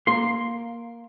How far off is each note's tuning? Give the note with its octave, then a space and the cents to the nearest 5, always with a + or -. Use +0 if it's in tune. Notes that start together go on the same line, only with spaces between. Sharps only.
A#3 +5 C6 +0